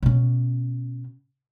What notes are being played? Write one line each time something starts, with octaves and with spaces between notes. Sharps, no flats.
B2 C#4